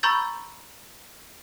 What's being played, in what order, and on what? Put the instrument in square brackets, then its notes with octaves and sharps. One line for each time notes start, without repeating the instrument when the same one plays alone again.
[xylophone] A#5 B5 C#6 E6 G6 A6